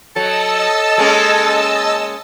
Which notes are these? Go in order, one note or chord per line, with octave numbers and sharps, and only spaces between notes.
F#3 A4 D#5 A5 E6
G#3 A#3 C#4